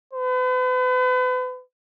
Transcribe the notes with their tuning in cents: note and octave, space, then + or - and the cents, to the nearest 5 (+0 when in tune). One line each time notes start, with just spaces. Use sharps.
B4 +40